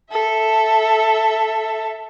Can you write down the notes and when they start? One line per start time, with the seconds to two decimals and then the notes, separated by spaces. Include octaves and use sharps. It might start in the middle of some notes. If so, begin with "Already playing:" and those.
0.10 A4 E5